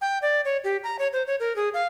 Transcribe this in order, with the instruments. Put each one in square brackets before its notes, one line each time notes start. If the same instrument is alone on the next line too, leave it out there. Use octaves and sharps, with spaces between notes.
[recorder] G5
D5
C#5
G4
A#5
C#5
C5
C#5
A#4
G#4
F5